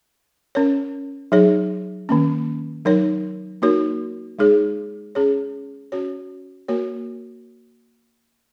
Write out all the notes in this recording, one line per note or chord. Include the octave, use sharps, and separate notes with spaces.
C#4 A#4 C#5
F#3 D#4 G#4 C#5
D#3 A#3 C#4
F#3 D#4 A#4 C#5
A#3 D#4 F#4 A#4 C#5
G#3 D#4 G#4 C#5
C#4 G#4 C#5
C#4 F#4 C#5
A#3 F#4 A#4 C#5